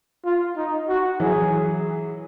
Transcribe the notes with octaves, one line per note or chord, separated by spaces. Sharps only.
F4
D#4
F#4
E3 F#3 G#4